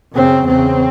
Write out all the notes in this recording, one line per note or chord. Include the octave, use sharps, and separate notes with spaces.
F#2 C#3 C4
E2 C#3 C4